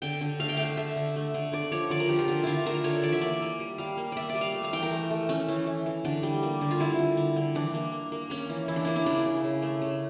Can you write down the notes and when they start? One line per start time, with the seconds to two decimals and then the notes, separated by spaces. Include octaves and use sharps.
0.02 D3 G5
0.21 D3
0.40 A3 F5
0.49 G5
0.57 A3 F5
0.77 A3 E5
0.96 D3
1.16 A3
1.34 D3
1.52 D3 D5
1.72 F3 C#5
1.90 D3 D5
2.00 A#4
2.09 F3 G4
2.19 F4
2.28 D3
2.43 D3 E4 F4
2.66 A3 A#4
2.84 D3 C#5
3.03 E3 D5
3.13 E5
3.21 A#3 D5
3.42 A#3
3.60 G3
3.78 G3 F5
3.97 A#3
4.12 A#3 D5 E5
4.30 D5
4.35 G3
4.41 F5
4.54 A3
4.64 F5
4.73 E3 G5
4.82 A#4
4.91 A3
5.11 A3
5.29 A3 C#4
5.48 E3
5.67 E3
5.86 E3
6.05 D3 D4
6.23 G3
6.43 A#3
6.61 D3
6.71 F4
6.80 G3 E4
6.99 D3
7.17 D3
7.36 D3
7.55 E3 D4
7.74 A#3
7.92 A#3
8.12 A#3
8.30 A#3 C#4
8.49 E3
8.68 E3 E4
8.76 D4
8.85 A#3 E4
8.96 E4
9.06 C#3 D4
9.25 C#3
9.44 C#3
9.62 A3
9.82 C#3